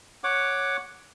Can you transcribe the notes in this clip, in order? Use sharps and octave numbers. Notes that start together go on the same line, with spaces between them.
C#5 F#5 D6